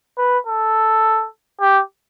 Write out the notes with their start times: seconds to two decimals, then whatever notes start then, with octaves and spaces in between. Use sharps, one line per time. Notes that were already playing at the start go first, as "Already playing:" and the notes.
0.18 B4
0.46 A4
1.61 G4